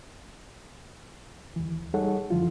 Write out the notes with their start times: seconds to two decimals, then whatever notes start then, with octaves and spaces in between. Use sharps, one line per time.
1.56 D#2 E3
1.94 G3 D#4 G#4 A4 C#5 F#5
2.30 F#2 D3 E3 F3 E4 F4